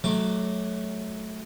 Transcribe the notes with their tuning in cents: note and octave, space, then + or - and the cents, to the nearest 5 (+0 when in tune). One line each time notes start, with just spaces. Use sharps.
F#3 +0 A3 -20 D6 +0